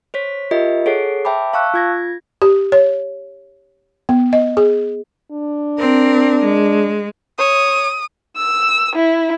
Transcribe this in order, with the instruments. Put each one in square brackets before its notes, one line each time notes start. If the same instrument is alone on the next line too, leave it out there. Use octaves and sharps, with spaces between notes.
[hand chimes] C5 C#5 B6
F4 G4 A#4 D#5 E5
G#4 A4 C#5 F#5 C7
C5 E5 G5 A5 B5 D6
F5 A5 C#6 E6 F#6
F4 G#6 A#6
[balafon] G4
C#5
B3
D#5
G#4
[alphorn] D4
[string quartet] C4 A#4
G#3
[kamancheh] C#5 [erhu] D#6
[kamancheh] E6
E4